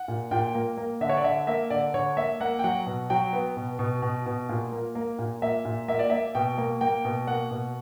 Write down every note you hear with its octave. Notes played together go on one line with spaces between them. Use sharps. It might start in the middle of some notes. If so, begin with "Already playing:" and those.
Already playing: F#5
A#2
A#2 G5
A#3
A#3
D3 E5
C#5
D5
D3 E5
A#3 E5
D3 D5
D3 C#5
A#3 E5
A#3 F#5
G5
F#3 F#5
B2
F#3 G5
B3
B2
B2
B2
B2
A#2
A#3
A#3
A#2
A#3 E5
A#2
A#3 E5
D5
A#3 E5
B2 G5
A#3
A#3 G5
B2
A#3 F#5
B2